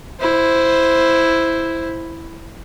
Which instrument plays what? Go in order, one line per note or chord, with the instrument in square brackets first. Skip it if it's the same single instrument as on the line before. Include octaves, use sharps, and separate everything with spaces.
[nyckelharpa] E4 C5